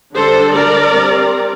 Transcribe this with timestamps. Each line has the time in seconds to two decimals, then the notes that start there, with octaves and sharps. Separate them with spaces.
0.15 D3 G3 D4 A4 C5
0.53 A#4 D5
0.90 G3 C4